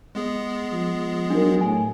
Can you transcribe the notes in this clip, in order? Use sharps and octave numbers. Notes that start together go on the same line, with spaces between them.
G#3 B3 G#4
F3
F#3 D4 D#4 A#4
A2 G#5